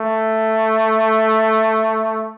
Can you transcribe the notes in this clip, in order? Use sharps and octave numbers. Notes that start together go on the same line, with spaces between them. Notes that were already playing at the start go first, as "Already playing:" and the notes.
Already playing: A3